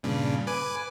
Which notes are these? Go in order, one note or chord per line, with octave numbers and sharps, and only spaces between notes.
G2 A#2 C#3
B4 G#5 D6